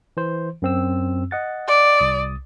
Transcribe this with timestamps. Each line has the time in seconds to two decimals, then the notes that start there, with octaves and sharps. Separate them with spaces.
0.17 E3 C5
0.62 F#2 C4 E6
1.31 D#5 F#5 A6
1.68 D5
1.98 C2 D#6 A6